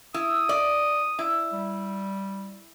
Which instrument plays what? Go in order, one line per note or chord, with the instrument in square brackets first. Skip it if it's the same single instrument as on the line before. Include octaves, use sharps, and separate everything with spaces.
[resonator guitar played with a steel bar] E4 [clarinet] D#6
[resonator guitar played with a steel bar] D5
E4
[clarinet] G3